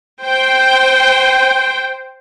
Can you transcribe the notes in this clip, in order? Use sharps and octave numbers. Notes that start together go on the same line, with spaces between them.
C5 G5